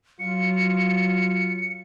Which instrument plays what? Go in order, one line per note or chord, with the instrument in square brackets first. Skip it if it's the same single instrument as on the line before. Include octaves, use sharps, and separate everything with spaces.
[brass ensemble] F#3 F4 [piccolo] C#7